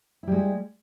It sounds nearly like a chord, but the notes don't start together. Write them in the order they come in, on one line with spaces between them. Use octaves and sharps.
E4 G3 G#3 G4